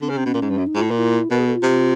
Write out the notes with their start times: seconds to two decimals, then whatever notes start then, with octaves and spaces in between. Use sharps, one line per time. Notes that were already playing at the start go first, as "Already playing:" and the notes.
0.01 D3 C4
0.09 C#3
0.12 C#4
0.18 C3
0.23 B2 C#4
0.34 A#2
0.42 G#2
0.50 G2
0.58 F#2
0.66 D#4
0.75 G#2 F4
0.82 A2
0.88 A#2 F4
0.98 E4
1.30 B2 A#4
1.38 G#4
1.47 A4
1.55 F4
1.62 C3